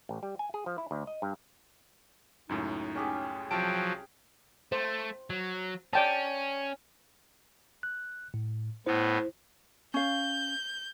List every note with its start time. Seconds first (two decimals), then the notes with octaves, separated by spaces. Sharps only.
0.09 A1
0.23 G3
0.39 G#5
0.54 G#4
0.66 F3
0.78 E4
0.91 D2
1.07 D#5
1.22 G2
2.49 C#2 F#2 A2 D#4
2.95 C#4 G4 G#4
3.51 C2 F3 F#3 G5 A5 D7
4.72 A3 C5
5.30 F#3
5.93 C#4 D5 G5 A5
7.83 F#6
8.34 A2
8.86 A2 B3 E4 C5
9.94 C#4 F5 G6